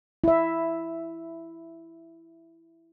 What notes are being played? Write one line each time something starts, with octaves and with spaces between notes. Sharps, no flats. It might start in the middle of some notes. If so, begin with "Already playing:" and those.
E4 E5